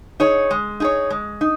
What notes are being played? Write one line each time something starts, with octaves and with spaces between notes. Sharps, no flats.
D#4 G#4 C#5
G#3
D#4 G#4 C#5
G#3
D#4